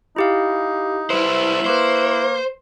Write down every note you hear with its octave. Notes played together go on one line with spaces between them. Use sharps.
D#4 E4 G4 F5
G3 E4 B4 C5
A#3 B4 C5 C#6